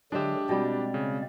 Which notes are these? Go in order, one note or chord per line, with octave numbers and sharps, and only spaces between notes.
D3 F#3 G#3 D4 G4 E5
B2 G3 G#3 C4 D5
C#3